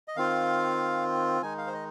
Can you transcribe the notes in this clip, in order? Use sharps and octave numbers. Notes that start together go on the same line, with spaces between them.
D#5
D#3 C4 F4 F5
D#3 G#3 D#4 G#5
F5
C5
D#5